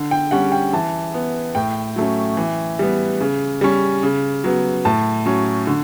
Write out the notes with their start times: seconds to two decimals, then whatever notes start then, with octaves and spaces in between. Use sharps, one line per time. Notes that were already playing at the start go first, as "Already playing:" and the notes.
Already playing: D3
0.11 G5
0.31 G3 C#4 F#5
0.52 G5
0.73 E3 A5
1.14 B3
1.55 A2 G5
1.96 F#3 A3 C#4
2.37 E3
2.79 G3 B3
3.21 C#3
3.61 G3 C#4
4.03 C#3
4.44 F#3 B3
4.85 A2 A5
5.26 F#3 C#4
5.67 D3